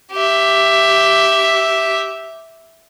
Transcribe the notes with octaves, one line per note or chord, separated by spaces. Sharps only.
G4 E5